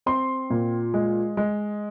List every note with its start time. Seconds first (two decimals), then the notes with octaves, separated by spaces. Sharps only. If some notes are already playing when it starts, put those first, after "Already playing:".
0.06 C4 C6
0.50 A#2
0.94 G#3
1.37 G#3